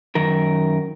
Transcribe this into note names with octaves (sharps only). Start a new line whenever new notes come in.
F#2 D#3 A#4